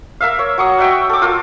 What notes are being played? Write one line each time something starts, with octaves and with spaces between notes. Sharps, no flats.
A#4 E5 F5
C#5
F#3 C#6 D#6
F#4 D#5 E5 G5
A4 D6
F4 A4 A#4